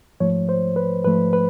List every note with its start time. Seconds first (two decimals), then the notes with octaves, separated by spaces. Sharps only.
0.20 G#2 F3 A3 C#5
0.49 C5
0.76 B4
1.04 G#2 F3 A3 B4
1.33 B4